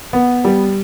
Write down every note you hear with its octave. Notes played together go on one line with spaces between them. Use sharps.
B3
G3